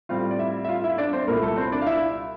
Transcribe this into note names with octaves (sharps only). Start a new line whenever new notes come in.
A2 G3 C4 F4 F5
D5
E4 E5
E5
F4 F5
E4 E5
D4 D5
C4 C5
C2 A#2 A3 A#3 E4 A#4
A3 A4
C4 C5
D4 D5
F5
E4 E5